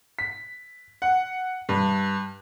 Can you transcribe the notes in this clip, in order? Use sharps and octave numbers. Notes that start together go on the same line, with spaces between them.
B6
F#5
G2